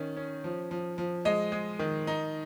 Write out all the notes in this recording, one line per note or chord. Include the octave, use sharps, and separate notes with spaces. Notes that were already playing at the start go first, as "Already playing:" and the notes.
Already playing: D#3 C#4
C#4
F3
F3
F3
G#3 D#5
G#3
D#3
D#4